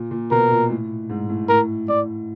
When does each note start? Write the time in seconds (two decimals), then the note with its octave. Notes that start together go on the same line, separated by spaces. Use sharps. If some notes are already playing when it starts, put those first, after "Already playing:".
Already playing: A#2
0.11 A#2
0.31 B2 A#4
0.51 A#2
0.70 A2
1.10 G#2
1.29 A2
1.49 A2 A#4
1.88 A2 D5